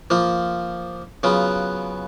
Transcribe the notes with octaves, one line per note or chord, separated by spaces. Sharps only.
F3 A#3 F4
C#3 F#3 B3 F4